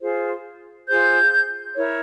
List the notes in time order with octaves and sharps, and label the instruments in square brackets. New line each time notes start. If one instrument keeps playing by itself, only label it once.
[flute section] F4 G#4 C5
F4 G#4 C5 G6
E4 A#4 C#5